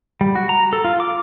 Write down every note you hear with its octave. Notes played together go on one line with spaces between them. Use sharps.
G3
F#4
A#5
A4
F4
D6